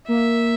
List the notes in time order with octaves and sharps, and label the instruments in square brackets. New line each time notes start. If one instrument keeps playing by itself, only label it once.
[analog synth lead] A#3 [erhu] E5